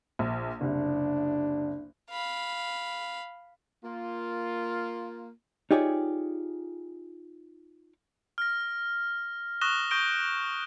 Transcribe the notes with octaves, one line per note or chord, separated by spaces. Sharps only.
A#1
F#1 C2 D4
F5 B5
A#3 F4
D#4 F4 G4 G#4 C#5 D5
F6 A#6
C#6 D#6 F#6 A#6 E7 G7
C#6 D#6 G6 A#6 D7 G7